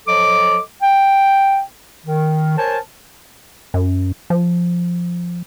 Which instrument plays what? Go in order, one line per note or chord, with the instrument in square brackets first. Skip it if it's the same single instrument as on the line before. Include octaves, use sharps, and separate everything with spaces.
[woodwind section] F3 F#3 A4 D#5 D6
G5
D#3
A#4 C5 C#5 G#5 A5
[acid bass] F#2
F3